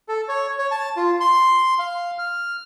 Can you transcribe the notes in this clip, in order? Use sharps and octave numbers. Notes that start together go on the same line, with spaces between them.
A4
C#5
C#5
A5
F4
C6
F5
F6